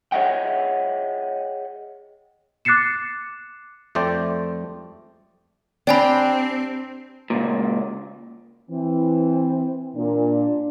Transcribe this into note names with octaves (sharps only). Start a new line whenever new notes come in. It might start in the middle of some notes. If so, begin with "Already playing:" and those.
G#4 C#5 D#5 E5 F#5 G5
D6 F#6 A6 C7 C#7 E7
F2 A3 C5 D5 G5
C4 D4 G4 D5 G5 G#5 B5
C#2 F#2 A#2
E3 C4
A#2 D4